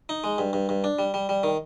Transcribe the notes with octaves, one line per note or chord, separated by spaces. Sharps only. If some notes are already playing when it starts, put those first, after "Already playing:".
D#4
G#3
G2
G2
G2
D4
G3
G3
G3
D#3